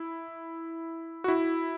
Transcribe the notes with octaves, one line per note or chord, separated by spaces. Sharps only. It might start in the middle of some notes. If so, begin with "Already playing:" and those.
Already playing: E4
F#4
E4